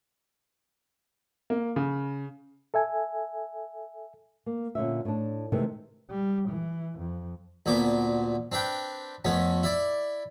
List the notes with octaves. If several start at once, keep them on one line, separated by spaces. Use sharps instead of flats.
A#3
C#3
A4 E5 G#5
A#3
A#2 D3 C#4 E5
A2 D4
C3 D#3 E3 G#3 A3
G3
E3
F2
D2 A#2 B3 D6
C4 D4 B4 G5
F2 A3 B3 C#4
E4 D5